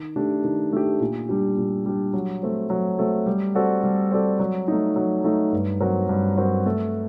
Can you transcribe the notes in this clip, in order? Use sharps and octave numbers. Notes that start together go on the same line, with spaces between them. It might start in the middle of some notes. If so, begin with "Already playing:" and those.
Already playing: D#3
A3 D4 G4
D#3
A3 D4 G4
A#2
G3 D4 G4
A#2
G3 D4 G4
F#3
A3 C4 F#4
F#3
A3 C4 F#4
G3
C4 F#4 A4 D5
G3
C4 F#4 A4 D5
F#3
A3 D#4
F#3
A3 D#4
G2
F#3 C4 F#4 A#4
G2
F#3 C4 F#4 A#4
A3